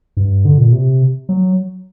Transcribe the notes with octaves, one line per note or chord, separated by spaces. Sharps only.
G2
D3
A#2
C3
F#3